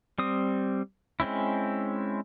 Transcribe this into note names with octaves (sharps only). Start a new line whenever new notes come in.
G3 C4 D#6
G#3 C4 C#4 E4